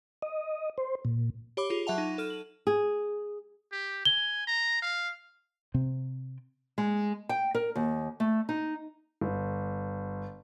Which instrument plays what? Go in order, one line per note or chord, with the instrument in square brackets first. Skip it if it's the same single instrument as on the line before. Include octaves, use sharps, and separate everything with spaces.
[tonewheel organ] D#5
C5
A#2
[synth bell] G4 C#5 B5 D6
F4 G#4
F#3 E5 F#5 A5 F7
D#4
A4 F6 D#7
F#7
[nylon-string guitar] G#4
[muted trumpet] G4
[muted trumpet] G#5 [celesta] G7
[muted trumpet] A#5
F5
[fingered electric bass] C3 C4
[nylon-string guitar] G#3
G5
A#4
D#2
A3
D#4
[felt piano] G1